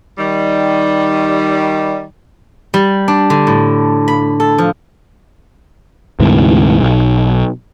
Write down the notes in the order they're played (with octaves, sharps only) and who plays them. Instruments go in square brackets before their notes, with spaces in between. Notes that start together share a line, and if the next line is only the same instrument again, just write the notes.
[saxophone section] D#3 G3
[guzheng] G3
D4
D3
A2
B5
A4
F3
[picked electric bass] D2 G#2 C3 E3
B1